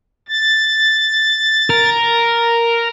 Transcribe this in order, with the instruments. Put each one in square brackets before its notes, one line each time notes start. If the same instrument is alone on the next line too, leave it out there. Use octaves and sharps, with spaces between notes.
[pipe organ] A6
[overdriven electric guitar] A#4